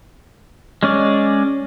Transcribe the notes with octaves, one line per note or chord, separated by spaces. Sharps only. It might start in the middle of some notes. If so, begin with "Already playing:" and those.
G#3 C#4 D5